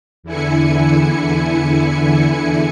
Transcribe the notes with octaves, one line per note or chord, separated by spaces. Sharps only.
E2 D3 E4 G#5 C#7